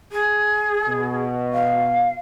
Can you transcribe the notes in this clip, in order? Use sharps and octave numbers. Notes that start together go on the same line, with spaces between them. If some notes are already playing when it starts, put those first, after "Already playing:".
G#4
B2
F5